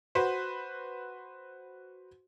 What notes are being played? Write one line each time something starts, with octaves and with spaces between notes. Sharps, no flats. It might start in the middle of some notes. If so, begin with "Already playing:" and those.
F#4 B4 C5